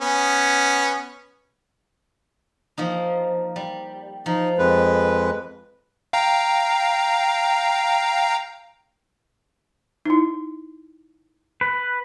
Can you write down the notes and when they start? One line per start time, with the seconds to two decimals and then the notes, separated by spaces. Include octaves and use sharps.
0.01 B3 C#4
2.77 F3 A#3 D#4
3.56 G3
4.26 F3 D#4
4.58 F2 G#3 B4
6.13 F5 G5 A#5
10.06 D#4 E4
11.61 B4